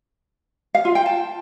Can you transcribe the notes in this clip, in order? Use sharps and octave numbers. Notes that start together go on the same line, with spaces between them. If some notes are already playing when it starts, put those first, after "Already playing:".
F5
F4
G5
A5